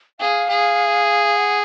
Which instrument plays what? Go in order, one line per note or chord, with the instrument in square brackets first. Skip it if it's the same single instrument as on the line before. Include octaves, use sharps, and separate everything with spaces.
[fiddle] G#4 [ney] F5
[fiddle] G#4
[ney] F#5